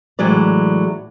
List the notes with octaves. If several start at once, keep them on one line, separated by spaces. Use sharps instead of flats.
A2 E3 F#3 G#3 D5